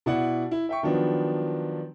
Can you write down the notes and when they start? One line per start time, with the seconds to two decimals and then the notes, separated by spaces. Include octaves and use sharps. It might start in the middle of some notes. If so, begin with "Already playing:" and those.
0.06 B2 E4 D5 F#5
0.51 E4
0.69 E5 G5 C#6
0.83 D#3 F3 F#3 B3 D4